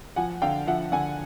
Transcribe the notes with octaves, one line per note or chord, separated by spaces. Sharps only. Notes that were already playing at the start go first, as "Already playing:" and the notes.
F3 F#5 G#5
D3 F5 G5
F3 E5 F#5
D3 F#5 G#5